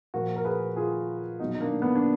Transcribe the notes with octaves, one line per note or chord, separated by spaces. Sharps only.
A#2 F3 F#4 A#4
A#4
G#4 B4
F4 G#4
B2 F#3 D#4 F#4
D#4
A#3 D4
B3
D4